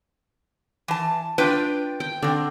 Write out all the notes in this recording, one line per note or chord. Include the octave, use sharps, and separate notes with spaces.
E3 A5
D4 F4 B4 G5
G5
D3 C4 D4